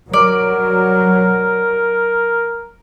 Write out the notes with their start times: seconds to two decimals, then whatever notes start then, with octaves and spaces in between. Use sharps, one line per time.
0.14 F#3 A#4 D5